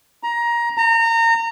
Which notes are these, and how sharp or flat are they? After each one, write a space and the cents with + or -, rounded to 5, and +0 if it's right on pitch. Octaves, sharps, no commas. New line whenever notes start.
A#5 +20
A#5 -30